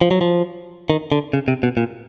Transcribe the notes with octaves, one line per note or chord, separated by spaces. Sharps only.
F3
F#3
F3
D#3
D3
C#3
C3
B2
A#2